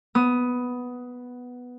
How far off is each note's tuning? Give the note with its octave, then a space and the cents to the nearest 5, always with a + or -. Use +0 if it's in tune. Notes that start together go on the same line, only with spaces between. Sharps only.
B3 +0 D#6 +10